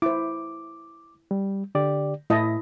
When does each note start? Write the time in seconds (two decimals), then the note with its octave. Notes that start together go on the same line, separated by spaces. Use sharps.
0.02 E4 C5 D6
1.31 G3
1.75 D3 G4 D5
2.30 A2 E4 D#5 A5